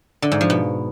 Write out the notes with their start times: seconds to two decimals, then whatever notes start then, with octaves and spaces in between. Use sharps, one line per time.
0.22 D3
0.32 G#2
0.41 F3
0.50 B2